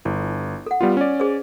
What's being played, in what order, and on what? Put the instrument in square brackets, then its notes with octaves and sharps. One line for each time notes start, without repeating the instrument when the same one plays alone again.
[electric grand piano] G1 [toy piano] E4
[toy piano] A4 F#5
[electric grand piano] G3 B3 F4
C#4 D5
[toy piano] G#4 C5